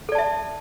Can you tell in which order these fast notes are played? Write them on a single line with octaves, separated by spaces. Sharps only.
A4 D5 A5 E5